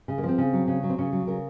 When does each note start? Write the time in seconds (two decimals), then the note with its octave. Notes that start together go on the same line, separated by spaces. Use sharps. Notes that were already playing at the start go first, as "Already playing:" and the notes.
0.08 C#3
0.18 A#3
0.23 F3
0.28 C4
0.38 C#3
0.53 F#3
0.68 C#3
0.83 F#3
0.90 C4
0.99 C#3 C#4
1.13 F#3
1.27 C#3 A#4